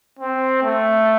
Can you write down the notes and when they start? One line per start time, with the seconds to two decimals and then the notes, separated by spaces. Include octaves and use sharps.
0.19 C4
0.63 A3